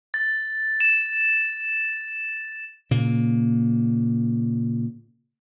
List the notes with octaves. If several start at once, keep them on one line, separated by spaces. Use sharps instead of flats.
A6
E7
A#2 C#3 A#3